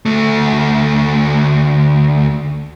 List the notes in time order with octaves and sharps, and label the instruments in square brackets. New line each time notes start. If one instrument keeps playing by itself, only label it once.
[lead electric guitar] D2 A3